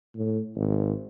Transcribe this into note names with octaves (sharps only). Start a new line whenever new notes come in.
A2
G#1